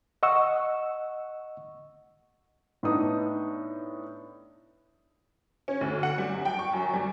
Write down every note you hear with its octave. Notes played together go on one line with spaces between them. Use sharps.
D#5 F#5 C#6 E6
A2 B3 D4 D#4 D#6
C#4
D2
F#5
G3
F#2
G5
C#6
F#2
G3